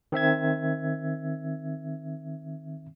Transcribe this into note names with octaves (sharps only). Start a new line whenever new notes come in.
D#3 C4 E5 G#6